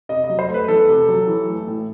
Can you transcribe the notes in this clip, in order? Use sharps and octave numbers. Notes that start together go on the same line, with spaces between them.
C3 D#5
D#5
F#3
C5
A3
B4
E2 A4
C3
F#3
E3
A3
A2